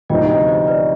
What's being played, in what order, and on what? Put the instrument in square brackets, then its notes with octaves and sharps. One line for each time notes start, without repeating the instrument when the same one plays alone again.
[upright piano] D2 C3 F3 B3 D#4 [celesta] D#5 G5
[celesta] C5 D#5
C5 D#5
B4 D5